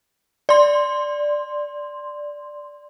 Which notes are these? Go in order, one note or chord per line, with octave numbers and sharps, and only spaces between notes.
D5 C6